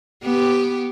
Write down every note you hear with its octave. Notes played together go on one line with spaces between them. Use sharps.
B3 G4